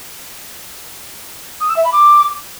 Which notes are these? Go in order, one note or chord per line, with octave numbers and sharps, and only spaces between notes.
D#6
E6
E5
B5
D6